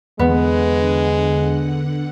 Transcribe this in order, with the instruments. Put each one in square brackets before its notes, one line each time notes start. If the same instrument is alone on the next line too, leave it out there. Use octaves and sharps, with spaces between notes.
[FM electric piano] E2 [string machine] D3 F#5 [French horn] G#3 [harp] B3